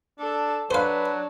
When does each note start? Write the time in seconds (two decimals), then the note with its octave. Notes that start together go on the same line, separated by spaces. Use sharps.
0.20 D4 A4
0.71 F#3 D4 B4 C5 F5